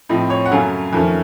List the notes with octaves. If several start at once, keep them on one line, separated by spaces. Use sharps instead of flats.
A2 F3 C4 D#5
C#5
F#5
F#2 C#3 F#3 A3 C#4 F5
F2 D#3 A3 C#4